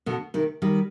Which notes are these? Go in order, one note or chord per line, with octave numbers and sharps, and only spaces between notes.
B2 D3
C3 D#3
D#3 G3